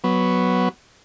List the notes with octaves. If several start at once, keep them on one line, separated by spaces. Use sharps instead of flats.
F#3 B3